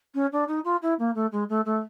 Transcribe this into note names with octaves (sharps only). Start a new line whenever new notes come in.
C#4
D4
D#4
F4
E4
A#3
A3
G#3
A3
A3